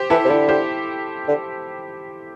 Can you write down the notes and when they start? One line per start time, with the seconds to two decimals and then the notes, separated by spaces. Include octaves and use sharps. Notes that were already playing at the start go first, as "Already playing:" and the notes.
Already playing: G4 C5
0.10 E3 E4 A4
0.25 C3
0.29 D3 E4 A4
0.49 G4 C5
1.28 D3